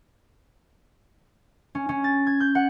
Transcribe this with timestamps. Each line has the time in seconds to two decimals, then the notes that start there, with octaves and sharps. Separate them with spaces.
1.75 C#4
1.89 C#4
2.04 A6
2.27 G#6
2.40 G6
2.55 F#5